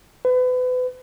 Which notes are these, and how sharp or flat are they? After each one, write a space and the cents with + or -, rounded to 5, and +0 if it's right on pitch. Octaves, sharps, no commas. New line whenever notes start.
B4 +35